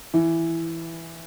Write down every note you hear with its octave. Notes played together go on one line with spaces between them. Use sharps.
E3